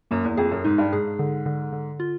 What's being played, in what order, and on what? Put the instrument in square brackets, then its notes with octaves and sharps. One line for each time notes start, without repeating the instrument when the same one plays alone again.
[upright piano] F#2 [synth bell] A#3
[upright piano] E2
[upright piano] F2 [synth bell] G#4
[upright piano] F#2
[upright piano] G#2 [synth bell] D#4
[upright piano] G2
[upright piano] G#2 [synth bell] G#4
[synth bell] D3
D3
D3
F4